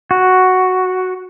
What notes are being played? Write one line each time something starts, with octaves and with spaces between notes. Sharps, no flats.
F#4